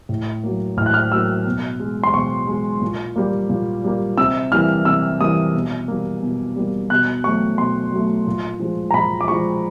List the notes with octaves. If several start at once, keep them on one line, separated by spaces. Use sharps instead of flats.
A2
F#3 A#3
A2 F6
F#6
F6
F#3 A#3 E6
B2
G#3
C6
B2 C#6
G#3
A#2
G3 A#3
A#2
G3 A#3
C3 E6
E3 G3 A#3 F6
C3 E6
E3 G3 A#3 D#6
B2
G3 A#3
B2
G3 A#3
B2 F#6
F#3 A3 C#6
B2 C6
F#3 A3
A#2
F3 G#3
A#5
A#2 B5
D6
F3 G#3 C#6